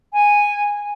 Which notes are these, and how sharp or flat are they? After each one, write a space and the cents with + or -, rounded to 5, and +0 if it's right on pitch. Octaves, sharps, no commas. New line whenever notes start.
G#5 -10